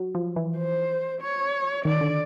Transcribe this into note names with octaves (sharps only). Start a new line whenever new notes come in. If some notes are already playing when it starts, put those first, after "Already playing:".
Already playing: F#3
F3
E3
C5
C#5
D#3 D5
D3